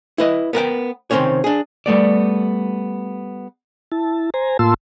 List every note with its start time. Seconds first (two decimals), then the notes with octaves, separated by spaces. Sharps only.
0.18 E4 B4 D#5
0.53 B3 A#4 F#5 G5
1.11 C3 D#3 C4 C#4 C#5
1.44 D4 G#4
1.86 G3 A3 B3 D5
3.92 E4 A5
4.34 C5 G#5 A#5
4.59 A2 A#3 F4 A5 C6 E6